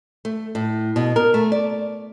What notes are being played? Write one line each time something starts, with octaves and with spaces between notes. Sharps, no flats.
A3
A2
B2
A#4
A3
D5